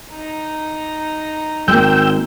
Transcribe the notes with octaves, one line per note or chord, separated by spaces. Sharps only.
D#4 A#5
G#1 G#3 A#3 G5 E6 G6